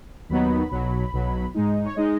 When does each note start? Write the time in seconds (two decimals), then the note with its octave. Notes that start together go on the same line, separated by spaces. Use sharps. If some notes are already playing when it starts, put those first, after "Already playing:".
0.29 D#2 D#3 F#3 B3 D#4 B5
0.71 B1 B2 F#3
1.13 B1 B2 F#3
1.54 G#2 G#3 D#4
1.85 C#5
1.96 G#3 D#4 D#5